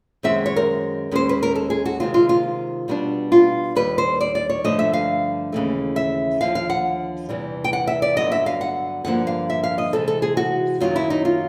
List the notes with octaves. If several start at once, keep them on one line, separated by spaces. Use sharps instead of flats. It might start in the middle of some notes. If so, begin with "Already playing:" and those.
F#2 D#3 G#3 C4 E5
C#5
A#4
D#2 D#3 G#3 C#4 C5
B4
A#4
A4
G#4
F#4
C3 D#3 G#3 C4 F4
F4
F4
B2 G3 B3 D4
F4
D#2 D#3 G3 B4
C5
D5
D5
C#5
G2 D3 F3 A3 D#5
E5
F5
D#2 C#3 E3 A3
E5
D#2 D3 F3 F5
F5
F#5
E2 C3 E3 G3
G5
F#5
E5
D5
G2 D3 F#3 B3 D#5
E5
F5
F#5
G2 D3 F3 A#3 F#5
F5
E5
F5
D#5
C3 E3 G#3 A4
A4
G#4
F#4
F#2 D#3 F#3 F4
E4
D#4
F4